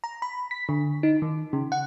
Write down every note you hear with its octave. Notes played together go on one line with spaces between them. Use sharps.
A#5
B5
B6
D3
D#4
D#3
C#3
F#5